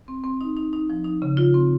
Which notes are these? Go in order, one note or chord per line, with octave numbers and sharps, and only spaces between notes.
C4
C4
D#4
D#4
D#4
F3
D#4
C#3
F4
C4